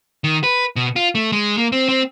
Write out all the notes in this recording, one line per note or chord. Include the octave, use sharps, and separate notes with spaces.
D#3
B4
B2
F4
A3
G#3
A#3
C4
C4